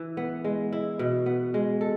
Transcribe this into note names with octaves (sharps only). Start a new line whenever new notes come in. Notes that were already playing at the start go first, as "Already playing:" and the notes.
Already playing: E3 E4
B3
G#3
E4
B2
B3
G#3
A4